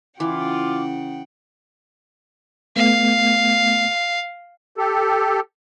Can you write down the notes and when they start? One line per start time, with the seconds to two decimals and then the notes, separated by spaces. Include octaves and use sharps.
0.20 C#3 E3 F4 F#5 G5 D6
2.76 A3 B3 F5
4.77 G4 A4